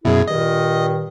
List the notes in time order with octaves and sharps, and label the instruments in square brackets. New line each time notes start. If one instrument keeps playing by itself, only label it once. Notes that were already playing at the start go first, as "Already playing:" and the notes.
[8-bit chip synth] F#2 B2 [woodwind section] E4 G#4
[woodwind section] G2 A#2 D#3 [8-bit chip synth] D#5